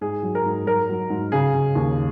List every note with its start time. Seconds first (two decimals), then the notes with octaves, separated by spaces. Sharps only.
0.01 G#2 G#4
0.23 F#3
0.35 A#4
0.46 G#2
0.67 F#3 A#4
0.89 F#3
1.10 G#2
1.32 C#3 G#4
1.54 C#3
1.75 D#2